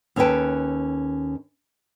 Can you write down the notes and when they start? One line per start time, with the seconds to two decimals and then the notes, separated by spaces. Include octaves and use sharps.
0.16 D#2 C#4 A4 B4 G5 A5